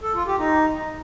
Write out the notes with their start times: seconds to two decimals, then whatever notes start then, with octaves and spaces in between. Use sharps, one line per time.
0.03 A4
0.15 F4
0.27 G4
0.39 D#4